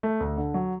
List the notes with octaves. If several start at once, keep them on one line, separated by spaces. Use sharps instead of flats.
A3
D2
D3
F#3